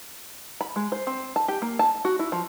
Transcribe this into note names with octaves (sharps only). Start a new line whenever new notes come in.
B5
G#3
C5
C4
A5
G4
A#3
A5
F#4
E4
F3